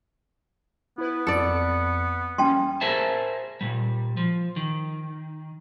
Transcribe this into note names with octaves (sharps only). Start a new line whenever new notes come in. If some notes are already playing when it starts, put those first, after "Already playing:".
B3 E4 B4
F2 A4 D5 C#7
G3 A#3 C#4 G5 A5 C6
G#4 A#4 C5 E5 A5
A#2 G3
F3
D#3